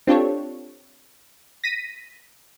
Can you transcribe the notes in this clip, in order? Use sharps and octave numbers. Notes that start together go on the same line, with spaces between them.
C4 D4 F4 G4 A4 C#5
A#6 B6 D#7